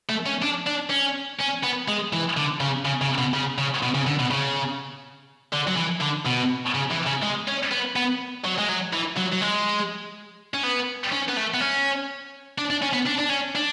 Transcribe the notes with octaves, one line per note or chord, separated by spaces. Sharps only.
A3
C#4
D4
D4
C#4
C#4
B3
G#3
E3
D3
C#3
C#3
C#3
B2
C#3
C#3
B2
C#3
D3
B2
C#3
D3
F#3
E3
D3
B2
C#3
E3
C#3
G#3
C#4
B3
B3
F#3
G#3
F#3
E3
F#3
F#3
G#3
C#4
B3
C#4
B3
A3
B3
C#4
D4
D4
C#4
B3
D4
D4
C#4
D4